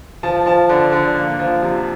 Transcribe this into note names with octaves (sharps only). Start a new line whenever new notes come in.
F3 A5
F3 A5
D3
D3
A#3
F3
C3